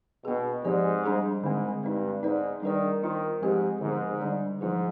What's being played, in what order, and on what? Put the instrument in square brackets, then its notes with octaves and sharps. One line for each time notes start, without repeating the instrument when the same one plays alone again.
[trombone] B2 [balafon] B3 D4 G#4
[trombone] G#2 [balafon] F3 C4 G4 D5
[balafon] G3 D4 G#4 C5
[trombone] G#2 [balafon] D3 G#3 C4
[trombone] G2 [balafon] G#3 C4 D#4
[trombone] G#2 [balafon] B3 D#4 B4 D5
[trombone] D#3 [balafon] G3 D4 G#4 B4 D5
[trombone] D#3 [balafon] B3 F4 C5
[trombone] G#2 [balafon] F3 G#3 C4 G4
[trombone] G#2 [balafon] D3 F3 B3
[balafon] D3 G3 D4 G#4 D5
[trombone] G#2 [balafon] F3 B3 F4 G#4 B4